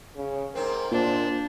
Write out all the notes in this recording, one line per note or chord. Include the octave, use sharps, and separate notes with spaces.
C#3
G#2 C4 A#4
A#2 D4 C5